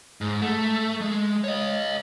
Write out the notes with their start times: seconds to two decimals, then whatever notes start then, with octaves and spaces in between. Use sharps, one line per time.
0.21 G#2
0.42 A3
1.01 G#3
1.44 C#5 D#5